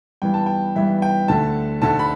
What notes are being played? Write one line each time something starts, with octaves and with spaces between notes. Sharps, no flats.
G2 E3 B3 G5
A5
G5
G2 E3 B3 E5
G5
D2 D3 A3 A5
D2 D3 A3 A5
B5